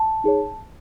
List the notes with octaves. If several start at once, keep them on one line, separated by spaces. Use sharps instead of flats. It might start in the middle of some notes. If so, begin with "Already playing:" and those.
Already playing: A5
D#4 G#4 C#5